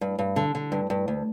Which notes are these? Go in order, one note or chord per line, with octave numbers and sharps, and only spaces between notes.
G2
G2
D3
D3
G2
G2
D2